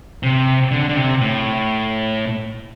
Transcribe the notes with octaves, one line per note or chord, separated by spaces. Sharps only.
C3
D3
D3
C3
A2